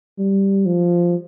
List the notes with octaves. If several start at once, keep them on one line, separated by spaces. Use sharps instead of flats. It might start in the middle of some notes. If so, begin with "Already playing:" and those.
G3
F3